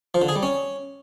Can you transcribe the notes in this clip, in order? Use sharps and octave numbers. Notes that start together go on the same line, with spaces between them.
F3
D3
G#4
G3
C#4